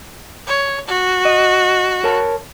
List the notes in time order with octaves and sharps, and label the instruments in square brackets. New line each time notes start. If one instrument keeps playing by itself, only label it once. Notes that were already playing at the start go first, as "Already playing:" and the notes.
[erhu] C#5
F#4
[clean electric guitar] D#5
A#4 C#5 A5